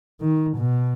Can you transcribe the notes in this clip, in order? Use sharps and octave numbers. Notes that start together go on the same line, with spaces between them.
D#3
B2